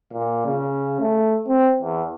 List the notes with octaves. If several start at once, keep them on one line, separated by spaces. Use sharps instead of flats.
A#2
C#3
A3
C4
E2